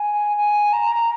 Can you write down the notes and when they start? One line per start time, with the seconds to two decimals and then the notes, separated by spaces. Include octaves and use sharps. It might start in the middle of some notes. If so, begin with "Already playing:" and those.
Already playing: G#5
0.37 G#5
0.73 A#5